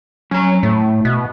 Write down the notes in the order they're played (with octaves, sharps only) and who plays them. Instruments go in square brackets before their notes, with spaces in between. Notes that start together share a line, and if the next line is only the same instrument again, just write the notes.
[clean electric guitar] F#3 A#5 [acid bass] C#4
[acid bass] A2 [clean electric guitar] A3
[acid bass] B2